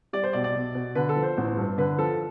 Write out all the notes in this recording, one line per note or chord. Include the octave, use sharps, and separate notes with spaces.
G3 D5
C5
B1 D5
D5
B1
B2
D3 B4
A4
F3
C5
A1
G2
D3 B4
F3 A4